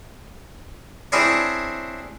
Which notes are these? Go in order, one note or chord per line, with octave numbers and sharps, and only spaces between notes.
C4 D4 E4 G#4 A#4 C#5